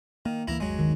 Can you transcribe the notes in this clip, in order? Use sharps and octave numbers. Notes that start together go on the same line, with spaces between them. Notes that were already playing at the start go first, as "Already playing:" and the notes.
D#3 A#3
D2 E3 A#3 E4 A#5
G1 D#2 F#3 G#3
D#3